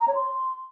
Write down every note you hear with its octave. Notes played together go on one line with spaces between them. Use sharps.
A#5
C#5
C6